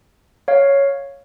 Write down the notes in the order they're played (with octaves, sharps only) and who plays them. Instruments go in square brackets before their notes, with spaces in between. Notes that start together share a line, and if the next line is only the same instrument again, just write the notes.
[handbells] C#5 F5